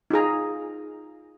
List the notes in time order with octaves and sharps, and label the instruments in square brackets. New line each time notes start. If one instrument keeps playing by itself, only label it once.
[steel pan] D#4 F4 G#4 A#5